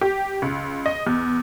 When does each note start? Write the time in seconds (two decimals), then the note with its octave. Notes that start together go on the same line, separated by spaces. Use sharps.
0.01 G4
0.42 C#2
0.86 D#5
1.07 E2